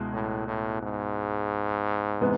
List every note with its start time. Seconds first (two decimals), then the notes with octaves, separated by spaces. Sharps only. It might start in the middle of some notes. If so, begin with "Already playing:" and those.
Already playing: C#2 B2 G#3 E4
0.13 A2
0.48 A2
0.82 G#2
2.21 C3 E3 G#3 B3